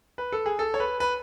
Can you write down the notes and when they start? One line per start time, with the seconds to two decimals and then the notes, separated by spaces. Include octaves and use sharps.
0.18 B4
0.32 A4
0.46 G#4
0.59 A4
0.74 C#5
0.80 B4
1.00 B4